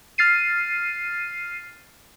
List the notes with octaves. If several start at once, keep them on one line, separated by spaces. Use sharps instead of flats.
F6 A6 C7 D#7